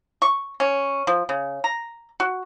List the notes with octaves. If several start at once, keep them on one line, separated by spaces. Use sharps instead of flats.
C#6
C#4
F3
C#3
A#5
F#4